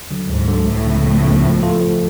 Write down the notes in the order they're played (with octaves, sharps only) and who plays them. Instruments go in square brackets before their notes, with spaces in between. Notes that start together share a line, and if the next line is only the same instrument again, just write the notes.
[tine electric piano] D3 F#3
[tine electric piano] D2 [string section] G#2
[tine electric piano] D3 F#3
[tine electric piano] C#2 [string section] A2
[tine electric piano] C#3 F3 B3
C#2
C#3 F3 B3
F3
A3 F4 A4
F3